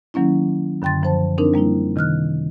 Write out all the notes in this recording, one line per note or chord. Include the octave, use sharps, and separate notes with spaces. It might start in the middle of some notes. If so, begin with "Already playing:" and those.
D#3 F#3 A#3 C#4 E4
F#2 D3 G5 C6 A6
F#2 F3 C5 A5
C4 D4 D#4 A#4
G3 A#3 D4 E4
C3 D#3 F6 F#6